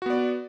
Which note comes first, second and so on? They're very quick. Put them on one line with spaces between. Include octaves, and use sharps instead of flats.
F#4 B3 D5